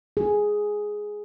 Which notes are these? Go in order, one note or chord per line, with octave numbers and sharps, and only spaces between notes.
G#4